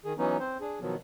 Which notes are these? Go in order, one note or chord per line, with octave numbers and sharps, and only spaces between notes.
D#3 G#4
E3 F#3 B3 C#4 D#4
C4 C5
D4 G#4
B2 D#3 F3 F#3 B3